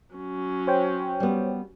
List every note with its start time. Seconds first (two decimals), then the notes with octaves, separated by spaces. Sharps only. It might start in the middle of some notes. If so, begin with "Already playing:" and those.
0.15 F#3 C#4
0.67 C5 C#5 G5
1.20 G3 B3